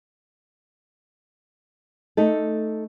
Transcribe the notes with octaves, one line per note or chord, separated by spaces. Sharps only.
A3 D#4 A4